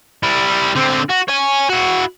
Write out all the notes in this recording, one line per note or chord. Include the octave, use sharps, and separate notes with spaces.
G3 E4
D3 C4
F#4
C#5 G#5
E4 F#4